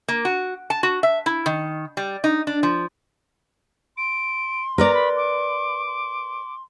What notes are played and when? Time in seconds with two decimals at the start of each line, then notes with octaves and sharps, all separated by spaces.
0.08 A#3
0.25 F#4
0.70 A5
0.83 F#4
1.03 E5
1.26 E4
1.46 D#3
1.97 G3
2.24 D#4
2.47 D4
2.63 F3
3.97 C6 D7
4.78 A#4 B4 D5 A#5
4.94 B5
5.16 D6
5.87 C6